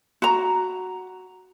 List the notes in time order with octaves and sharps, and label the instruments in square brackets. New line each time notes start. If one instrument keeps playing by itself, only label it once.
[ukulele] F#4 A#5